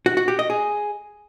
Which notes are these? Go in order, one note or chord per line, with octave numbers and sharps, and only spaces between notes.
F#4
F#4
G4
D#5
G#4